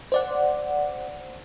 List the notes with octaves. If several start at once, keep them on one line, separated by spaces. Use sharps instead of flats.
C5 D5 F#5